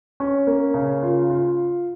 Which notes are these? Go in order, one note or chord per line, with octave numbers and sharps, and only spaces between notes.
C#4
A#3
C#3
F4
F4